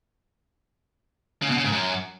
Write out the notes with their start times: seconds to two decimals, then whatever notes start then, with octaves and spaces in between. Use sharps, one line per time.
1.42 C#3
1.50 B2
1.57 C#3
1.64 G#2
1.72 F#2